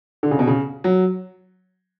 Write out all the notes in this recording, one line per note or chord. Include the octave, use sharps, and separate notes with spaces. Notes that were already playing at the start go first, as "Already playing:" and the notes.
D3
C#3
B2
C#3
F#3